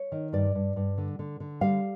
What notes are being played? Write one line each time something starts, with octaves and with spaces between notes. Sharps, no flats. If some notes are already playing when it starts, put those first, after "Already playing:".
Already playing: C#5
D#3
G2 D5
G2
G2
D3
D3
D3
G3 F5